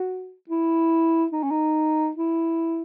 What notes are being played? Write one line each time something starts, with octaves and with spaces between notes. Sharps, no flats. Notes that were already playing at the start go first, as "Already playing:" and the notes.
Already playing: F#4
E4
D#4
C#4
D#4
E4